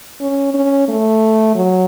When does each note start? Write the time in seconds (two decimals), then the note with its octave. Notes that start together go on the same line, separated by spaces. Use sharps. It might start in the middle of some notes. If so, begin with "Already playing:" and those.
0.21 C#4
0.54 C#4
0.88 A3
1.55 F#3